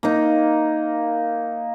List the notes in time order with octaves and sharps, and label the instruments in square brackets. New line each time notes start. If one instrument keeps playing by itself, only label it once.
[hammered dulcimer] A#3 D#4